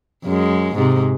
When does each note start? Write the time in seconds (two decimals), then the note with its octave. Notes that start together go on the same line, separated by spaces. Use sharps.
0.25 F#2 G#3
0.75 G#2 C3